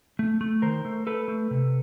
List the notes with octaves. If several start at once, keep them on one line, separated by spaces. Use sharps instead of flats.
A3
A3
D#3 A#4 C5
A3
A3 A4 B4
A3
C3